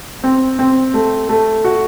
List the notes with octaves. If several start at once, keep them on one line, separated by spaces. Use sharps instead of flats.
C4
C4
A3
A3
F#4